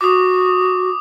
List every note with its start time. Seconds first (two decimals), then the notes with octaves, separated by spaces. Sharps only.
0.01 F#4 D6 D#6